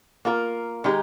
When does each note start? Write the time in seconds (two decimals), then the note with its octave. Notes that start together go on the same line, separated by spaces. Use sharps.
0.25 A#3 F4 A#4
0.84 D#3 G#3 D#4 G4